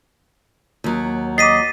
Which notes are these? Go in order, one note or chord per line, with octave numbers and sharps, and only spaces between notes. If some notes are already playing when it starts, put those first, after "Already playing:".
D#2 F#3
D#5 D6 A6 B6 C7 D#7